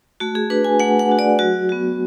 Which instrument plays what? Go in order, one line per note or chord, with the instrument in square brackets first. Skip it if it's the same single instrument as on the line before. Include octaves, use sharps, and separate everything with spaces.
[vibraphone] A3 F#4
G#4
D4 F#4 B4
G#5
A3 F#5
F#5
D4 F#4
D5
F#3 F#4
B3 F#4